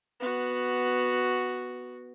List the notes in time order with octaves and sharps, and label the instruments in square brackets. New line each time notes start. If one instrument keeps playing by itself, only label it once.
[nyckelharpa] B3 F#4